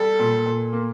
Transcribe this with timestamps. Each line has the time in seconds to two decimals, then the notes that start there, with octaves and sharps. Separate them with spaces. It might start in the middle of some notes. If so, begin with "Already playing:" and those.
Already playing: G3 A4
0.19 A#2
0.46 A#2
0.73 A#3